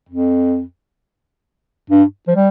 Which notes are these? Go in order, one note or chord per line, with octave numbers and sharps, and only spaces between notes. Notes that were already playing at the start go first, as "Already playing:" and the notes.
F2
G2
F3
G3